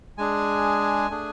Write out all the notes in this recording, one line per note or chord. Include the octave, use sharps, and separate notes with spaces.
G#3 D4 G#4 G#5
A3 D4 G#4